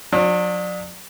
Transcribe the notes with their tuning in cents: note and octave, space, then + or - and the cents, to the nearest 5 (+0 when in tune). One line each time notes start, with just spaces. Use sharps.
F#3 -40 D4 +30